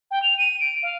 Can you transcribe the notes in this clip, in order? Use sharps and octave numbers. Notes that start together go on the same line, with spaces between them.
G5
F7
D#7
D7
F5